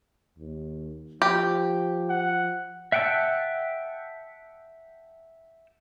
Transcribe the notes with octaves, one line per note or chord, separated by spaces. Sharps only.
D#2
F3 G4
F#5
E5 F#5 G5 A5 E6